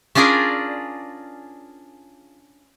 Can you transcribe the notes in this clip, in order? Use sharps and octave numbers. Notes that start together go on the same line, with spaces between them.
C#4 D4 F4 G#4 A#4 D5